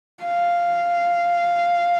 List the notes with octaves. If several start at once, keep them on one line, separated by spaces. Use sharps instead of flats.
F5